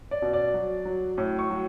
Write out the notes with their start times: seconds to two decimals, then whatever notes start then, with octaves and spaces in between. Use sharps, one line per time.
0.11 D5
0.22 B2
0.33 D5
0.54 F#3
0.85 F#3
1.18 A2
1.39 C#6
1.50 F#3